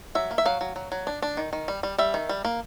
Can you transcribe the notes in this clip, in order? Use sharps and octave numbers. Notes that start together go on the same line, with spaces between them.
F#3 E5
A#3
E5
F#3 F5
F#3
F#3
F#3
D4
D4
D#3
D#3
G3
G3
G3 E5
D#3
G3
A#3